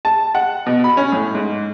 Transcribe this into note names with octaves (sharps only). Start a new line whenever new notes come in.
A5
F#5
B2
B5
C#4
A2
G#2